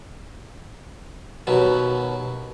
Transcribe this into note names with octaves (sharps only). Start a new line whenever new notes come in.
D#2 B2 F#3